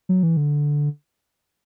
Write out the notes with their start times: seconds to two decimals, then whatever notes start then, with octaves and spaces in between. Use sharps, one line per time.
0.09 F#3
0.23 E3
0.37 D3